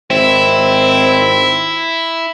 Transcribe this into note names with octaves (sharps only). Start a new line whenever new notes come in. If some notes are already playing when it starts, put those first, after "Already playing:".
G#1 C4 E4